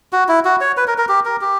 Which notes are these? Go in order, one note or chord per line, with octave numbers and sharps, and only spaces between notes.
F#4
E4
F#4
C#5
B4
A#4
A#4
G4
A#4
G4